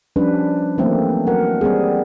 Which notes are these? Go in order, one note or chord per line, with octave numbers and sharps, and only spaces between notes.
F3 G3 C#4 D4 B4
E3 F#3 A3 A#3 C4
F#3 A#4 F#5
G3 B3 C4 G#4